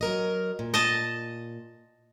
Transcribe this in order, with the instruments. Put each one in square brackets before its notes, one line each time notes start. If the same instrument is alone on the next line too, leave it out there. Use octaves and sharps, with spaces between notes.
[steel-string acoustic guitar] F#3 A#4 D#5
A#2
[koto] D#5 A5